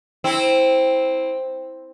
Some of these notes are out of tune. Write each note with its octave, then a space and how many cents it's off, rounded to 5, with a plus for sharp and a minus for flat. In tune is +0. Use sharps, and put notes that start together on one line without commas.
C4 +0 E4 -15